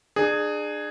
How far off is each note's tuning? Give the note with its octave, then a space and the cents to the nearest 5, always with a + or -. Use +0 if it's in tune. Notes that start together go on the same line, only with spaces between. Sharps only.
D4 +35 G#4 +0